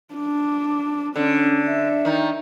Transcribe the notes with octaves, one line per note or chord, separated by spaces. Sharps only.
D4
D3 C#4
E5
D#3 D#4